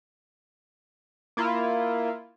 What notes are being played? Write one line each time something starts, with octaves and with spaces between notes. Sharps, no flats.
A#3 E4 F4